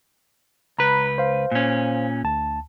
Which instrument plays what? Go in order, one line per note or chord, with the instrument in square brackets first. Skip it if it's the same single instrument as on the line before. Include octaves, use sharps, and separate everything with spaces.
[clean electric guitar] C#2 B4 [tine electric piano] A#5 B5 F#6
[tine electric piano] C5 F5
[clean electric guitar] A#2 C#4
[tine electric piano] D2 A5